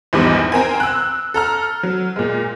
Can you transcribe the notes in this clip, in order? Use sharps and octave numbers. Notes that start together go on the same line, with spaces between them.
A#1 E2 G#2 G3 D6
C4 A#4 G#5
E6 F#6
A4 A#5 F6
F#3
A#2 G#3